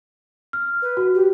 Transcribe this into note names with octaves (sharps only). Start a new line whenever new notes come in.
F6
B4
F#4
G4